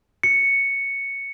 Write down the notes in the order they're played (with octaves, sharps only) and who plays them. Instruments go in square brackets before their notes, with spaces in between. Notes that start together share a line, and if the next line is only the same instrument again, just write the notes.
[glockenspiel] C#7